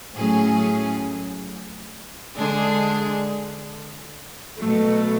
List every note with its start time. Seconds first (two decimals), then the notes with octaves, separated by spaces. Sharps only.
0.14 A2 F#3 C#4 G#4
2.36 D3 G#3 D4 G#4
4.58 B2 F#3 A3